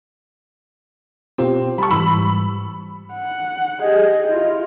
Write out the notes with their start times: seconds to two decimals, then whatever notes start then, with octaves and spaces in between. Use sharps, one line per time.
1.38 B2 C4 F4 G4
1.78 G3 A5 B5 C#6
1.91 G#2 E3 G3 B5 E6
3.14 F#5
3.81 G4 G#4 D#5
4.28 E4 F4